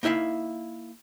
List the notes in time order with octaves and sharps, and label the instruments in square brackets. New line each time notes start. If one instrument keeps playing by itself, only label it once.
[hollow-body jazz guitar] A#3 D#4 E4 E5 F5